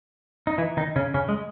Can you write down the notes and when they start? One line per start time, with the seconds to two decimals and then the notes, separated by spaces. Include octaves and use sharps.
0.47 D#4
0.58 E3 E4
0.77 D#3 D#4
0.96 C#3 C#4
1.14 C#3 C#4
1.29 G#3